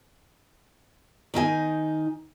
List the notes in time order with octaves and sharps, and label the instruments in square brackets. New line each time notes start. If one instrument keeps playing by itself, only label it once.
[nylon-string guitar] D#3 D#4 E5 G#5